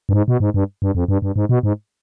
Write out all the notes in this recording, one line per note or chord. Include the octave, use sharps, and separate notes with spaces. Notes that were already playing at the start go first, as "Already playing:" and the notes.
G2
G#2
B2
G#2
G2
G2
F2
G2
G2
G#2
B2
G#2